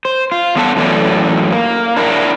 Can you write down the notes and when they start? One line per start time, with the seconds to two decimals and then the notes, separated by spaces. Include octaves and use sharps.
0.05 C5
0.32 F4
0.56 E2 B3 D4 A4 F#5 A5
0.76 F#2 A2 E3 A4 D5
1.53 A#3
1.97 D4 E4 A#4